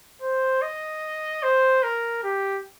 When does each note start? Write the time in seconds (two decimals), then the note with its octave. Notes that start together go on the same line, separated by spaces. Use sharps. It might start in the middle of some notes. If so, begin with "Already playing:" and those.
0.22 C5
0.62 D#5
1.43 C5
1.83 A#4
2.24 G4